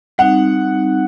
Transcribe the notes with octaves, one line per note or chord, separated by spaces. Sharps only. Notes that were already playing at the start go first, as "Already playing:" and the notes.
G3 C4 D#4 F#5